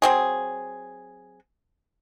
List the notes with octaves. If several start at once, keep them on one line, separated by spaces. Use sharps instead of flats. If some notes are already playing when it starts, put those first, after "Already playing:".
F#3 C4 G#4